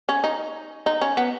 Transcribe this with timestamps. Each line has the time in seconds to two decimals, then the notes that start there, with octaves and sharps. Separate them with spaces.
0.09 C#4
0.24 D#4
0.86 D#4
1.01 C#4
1.17 B3